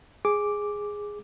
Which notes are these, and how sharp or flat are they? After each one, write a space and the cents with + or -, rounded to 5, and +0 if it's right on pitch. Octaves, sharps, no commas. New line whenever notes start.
G#4 -5 D6 +0